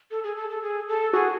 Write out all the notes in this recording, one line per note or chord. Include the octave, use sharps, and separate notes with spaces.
A4
G#4
A4
A4
G#4
A4
F#4 G#4